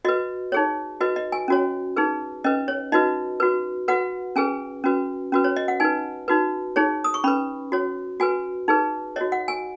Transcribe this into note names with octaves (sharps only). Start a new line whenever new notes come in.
F#4 B4 D#5
D#4 G#4 C#5
F#4 B4 D#5
D#5
G#5
C#4 F#4 C#5
D#4 G#4 B4
C#4 B4 D#5
C#5
D#4 F#4 B4 D#5
F#4 B4
F#4 B4 F#5
C#4 G#4 B4 G#5
C#4 F#4 B4
C#4 F#4 B4
C#5
D#5
F#5
D#4 B4 G#5
D#4 F#4 B4
D#4 G#4 C#5
D#6
C#6
C#4 B4 B5
F#4 C#5
F#4 B4 G#5
D#4 G#4 B4
F#4 C#5 D#5
F#5
G#5